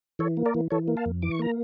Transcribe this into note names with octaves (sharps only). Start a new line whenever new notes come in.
E3 A4 C#5
A#3
A#4 D5
E3
E3 A4 C#5
A#3
F5 A5
F2
E3 D6
C#6
A#3 A#5